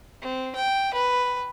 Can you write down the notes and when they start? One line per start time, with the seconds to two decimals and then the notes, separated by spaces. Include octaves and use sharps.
0.21 C4
0.55 G5
0.94 B4